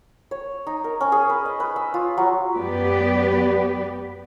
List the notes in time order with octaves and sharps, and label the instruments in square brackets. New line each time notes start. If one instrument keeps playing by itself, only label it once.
[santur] C#5
D#4
A#4
C#4
G#4
B4
D#5
B4
E6
F4
F#3
[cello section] F#2 B3 G4 B4 D5